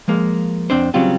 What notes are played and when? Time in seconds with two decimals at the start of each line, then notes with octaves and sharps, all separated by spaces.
0.08 F3 G#3 A#3
0.70 F2 C4 D4 C5
0.94 C#3 F#3 G3 C4 F4 G4